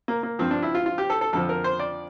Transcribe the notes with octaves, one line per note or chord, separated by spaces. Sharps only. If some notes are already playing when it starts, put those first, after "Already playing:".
A#3
A#3
G2 F3 C4
D4
E4
F4
F4
G4
A4
A4
F2 D3 F3 A4
A#4
C5
D5